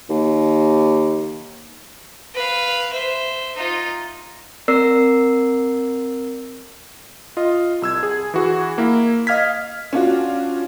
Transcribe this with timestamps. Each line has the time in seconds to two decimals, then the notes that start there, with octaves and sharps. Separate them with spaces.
0.10 D#2
2.35 B4 F5
2.93 C5 E5
3.56 D#4 F4
4.68 C4 A#4 D5 E6 C7
7.37 F4 D#5
7.82 C2 E6 G#6
8.03 G#4
8.34 E3 F#4 G#4
8.78 A#3 E4
9.27 D#5 F5 F6 G#6 B6
9.93 C#4 D4 F4 F#4